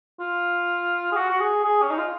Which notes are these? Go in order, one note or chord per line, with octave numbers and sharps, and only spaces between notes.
F4
G#4
F#4
F#4
G#4
G#4
C#4
D#4
F4